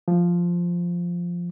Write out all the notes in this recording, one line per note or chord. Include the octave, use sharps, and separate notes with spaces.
F3